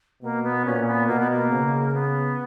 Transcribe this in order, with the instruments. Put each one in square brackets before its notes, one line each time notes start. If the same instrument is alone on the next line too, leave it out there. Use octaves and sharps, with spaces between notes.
[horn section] B2 [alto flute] A#3
[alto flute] B3
[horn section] A#2 [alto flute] C#4
[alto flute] B3
[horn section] B2 [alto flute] A#3
[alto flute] B3
A#3
[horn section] C#3
[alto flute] A#3
B3